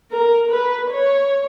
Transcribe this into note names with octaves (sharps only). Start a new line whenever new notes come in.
A#4
B4
C#5